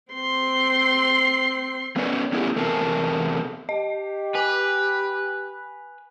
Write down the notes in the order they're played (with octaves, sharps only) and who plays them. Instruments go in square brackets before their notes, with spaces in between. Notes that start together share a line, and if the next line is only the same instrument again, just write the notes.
[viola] C4 C6
[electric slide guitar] A3 B3 C#4 B4 C#5 D5
A3 B3 C#4 E4 G4 G#4
E2 C3 A3 G#4 A#4 A5
[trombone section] G4 [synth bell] D#5
[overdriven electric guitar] B4 [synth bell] G#5